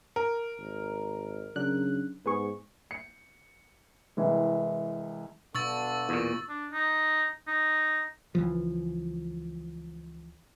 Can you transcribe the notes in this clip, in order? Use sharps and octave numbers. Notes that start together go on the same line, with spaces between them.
A#4
G#1
C#3 F#3 D4 F#6
G#2 B3 G#4 C#6
C#7
C2 E3 G#3
G2 B2 D3 C#6 E6 A6
E2 A#2
D4
D#4
D#4
C#2 E3 F3